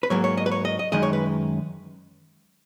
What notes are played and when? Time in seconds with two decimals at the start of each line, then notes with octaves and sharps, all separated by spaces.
0.03 B4
0.10 G#2 F#3 A#3 C#5
0.24 C#5
0.37 D#5
0.46 B4
0.51 C#5
0.65 D#5
0.79 D#5
0.92 F#2 D#3 G#3 D#5
1.03 C#5
1.13 B4